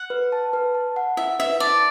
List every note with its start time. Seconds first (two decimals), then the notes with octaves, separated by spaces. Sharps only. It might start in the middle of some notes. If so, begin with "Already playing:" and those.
Already playing: F#5
0.10 B4
0.32 A5
0.53 B4
0.75 A5
0.96 F#5
1.17 E4 E5
1.39 B4 E5
1.60 D5 A5